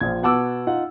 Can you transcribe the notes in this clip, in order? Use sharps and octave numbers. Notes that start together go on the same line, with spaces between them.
A#1 F3 G#6
B2 B3 F#5 A5 D6 E6
D#4 F4 F#5